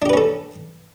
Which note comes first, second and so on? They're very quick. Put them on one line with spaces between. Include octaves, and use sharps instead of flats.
D4 G4 B4 C#4 A4